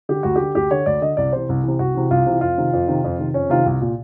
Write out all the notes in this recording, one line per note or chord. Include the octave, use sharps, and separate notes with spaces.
D3 G4
D2 F#4
D3 G4
D2 G4
D3 C#5
D2 D5
D3 D#5
C2 D5
C3 E3 C5
C2
C3 E3
C2 F#4
C3 E3
C2 F4
C3 E3
F2 F4
C3 D#3
F2
C3 D#3
F2
C3 D#3
F2 C#4
C3 D#3 F4
C2
A#2